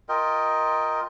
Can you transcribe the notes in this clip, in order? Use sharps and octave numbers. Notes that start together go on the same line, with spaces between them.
F4 A#4 D#5 G5